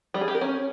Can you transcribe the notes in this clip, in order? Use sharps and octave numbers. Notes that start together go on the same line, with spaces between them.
G3
G#4
G4
A#4
C#4